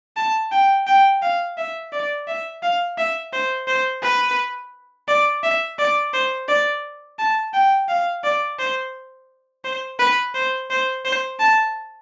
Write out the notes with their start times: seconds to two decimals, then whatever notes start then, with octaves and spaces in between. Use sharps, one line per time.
0.17 A5
0.52 G5
0.87 G5
1.22 F5
1.58 E5
1.92 D5
2.28 E5
2.63 F5
2.98 E5
3.33 C5
3.67 C5
4.03 B4
5.08 D5
5.44 E5
5.79 D5
6.14 C5
6.49 D5
7.19 A5
7.54 G5
7.89 F5
8.24 D5
8.59 C5
9.65 C5
9.99 B4
10.35 C5
10.70 C5
11.05 C5
11.40 A5